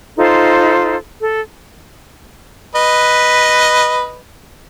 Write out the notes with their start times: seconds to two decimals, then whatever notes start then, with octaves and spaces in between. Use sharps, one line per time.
0.17 D#4 F4 A4 C5
1.20 A4
2.75 B4 D#5